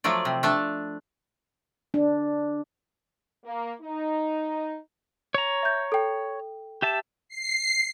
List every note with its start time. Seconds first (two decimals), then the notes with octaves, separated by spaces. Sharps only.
0.04 F3 F#3 A3 D5
0.25 C3
0.43 A3 D4 A5
1.94 D4
3.45 A#3
3.81 D#4
5.34 C#5 A#5
5.63 E5 G6
5.92 A4 G5
6.82 G4 E5 A5 E7
7.28 C7